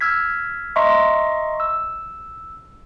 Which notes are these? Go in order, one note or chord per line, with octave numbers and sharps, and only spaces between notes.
E6 F6 G#6 B6
D#5 E5 A#5 C6 C#6
E6